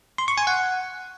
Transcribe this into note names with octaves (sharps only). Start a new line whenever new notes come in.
C6
C#6
G#5
F#5